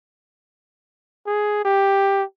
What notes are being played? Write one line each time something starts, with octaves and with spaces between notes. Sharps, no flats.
G#4
G4